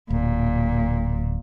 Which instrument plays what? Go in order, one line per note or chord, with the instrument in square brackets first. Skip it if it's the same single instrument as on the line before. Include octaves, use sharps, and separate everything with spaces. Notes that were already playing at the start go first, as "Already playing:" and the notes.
[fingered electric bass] D1 [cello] A#2